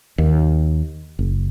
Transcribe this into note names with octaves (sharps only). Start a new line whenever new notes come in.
D#2
F#1